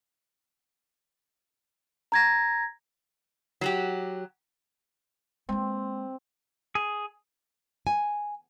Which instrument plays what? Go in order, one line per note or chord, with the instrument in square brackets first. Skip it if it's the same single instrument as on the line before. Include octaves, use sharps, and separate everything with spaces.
[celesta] A#5 G#6 A#6
[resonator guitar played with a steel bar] F#3 F#4 G4
[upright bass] G#3 A#3 [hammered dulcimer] C4
[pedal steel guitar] G#4
[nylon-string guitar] G#5